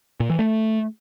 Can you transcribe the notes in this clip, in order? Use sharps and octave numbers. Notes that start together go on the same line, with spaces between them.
A#2
E3
A3